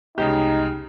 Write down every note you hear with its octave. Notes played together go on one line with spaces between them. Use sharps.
C2 F2 C#3 G#3 B3 D#4 G4